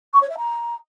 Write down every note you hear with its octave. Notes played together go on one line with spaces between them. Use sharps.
C#6
C#5
E5
A#5